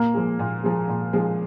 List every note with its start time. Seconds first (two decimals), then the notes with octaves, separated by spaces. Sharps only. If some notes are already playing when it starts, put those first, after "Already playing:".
Already playing: A#2 A#3
0.14 F3 G#3
0.39 A#2
0.63 F3 G#3
0.88 A#2
1.13 F3 G#3